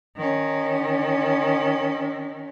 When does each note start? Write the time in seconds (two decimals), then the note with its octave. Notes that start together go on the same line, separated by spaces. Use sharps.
0.17 D#3 C#4